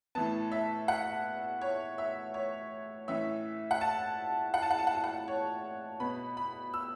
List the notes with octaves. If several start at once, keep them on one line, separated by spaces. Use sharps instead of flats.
A2 E3 B3 A5
E5
F#5
C#5
E5
C#5
A2 E3 C#4 E5
F#5
A5
F#5
A5
F#5
A5
F#5
A5
F#5
C#5
B2 B3 B5
B5
E6